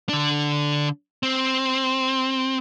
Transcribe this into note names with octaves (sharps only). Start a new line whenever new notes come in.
D3 D4
C4